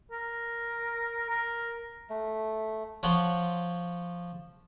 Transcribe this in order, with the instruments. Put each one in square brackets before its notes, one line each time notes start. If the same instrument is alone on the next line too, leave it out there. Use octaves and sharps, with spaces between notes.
[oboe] A#4
A#4
[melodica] A3
[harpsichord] F3 C#5 F#5 C6